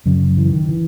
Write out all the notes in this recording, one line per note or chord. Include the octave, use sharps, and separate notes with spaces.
F#2 C#3 F#3
E3
D#3
E3